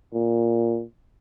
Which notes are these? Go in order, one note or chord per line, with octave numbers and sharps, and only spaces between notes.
A#2